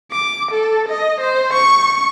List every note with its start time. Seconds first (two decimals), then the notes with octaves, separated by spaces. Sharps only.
0.12 D6
0.52 A4
0.89 D#5
1.21 C5
1.54 C#6